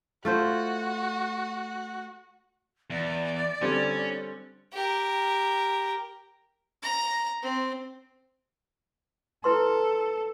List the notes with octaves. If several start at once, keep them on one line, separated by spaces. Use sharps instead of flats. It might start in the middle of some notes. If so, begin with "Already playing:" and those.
A3 F4 F#4 C5
E2 D5
D3 G3 C4 C#4
G4 A#4
A#5
C4
E4 A4 B4 C6